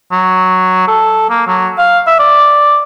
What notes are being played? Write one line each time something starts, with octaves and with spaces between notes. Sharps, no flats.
F#3
A4
A#3
F#3
F5
E5
D5